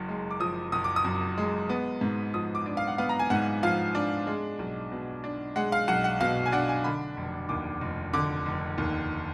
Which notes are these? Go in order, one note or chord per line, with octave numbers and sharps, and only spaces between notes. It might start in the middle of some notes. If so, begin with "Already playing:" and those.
Already playing: F#1 F#2
G#3
D6
F3 D#6
F#1 D#6
D6
D#6
F#2
G#3
B3
G#2
F3 D#6
D6
D4
F5
F#5
B3 F5
A#5
G#5
G#2 F#5
F3 F5
D4
G#3
B1
B2
D4
G#3 F#5
F5
B1 F#5
F#5
B2 F5
G#5
D4 F#5
G#5
D3 B5
F1
D#2 D6
F1
D3 D6
F1
D#2